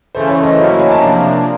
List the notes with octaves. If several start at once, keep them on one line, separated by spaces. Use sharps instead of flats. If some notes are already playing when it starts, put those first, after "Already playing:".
C#3 E3 A3 C5
C#5
D#5
F#3 A#3 C#4 E4 D#5
D#5
G#5
A5
C3 F3 A#3 D4 A#5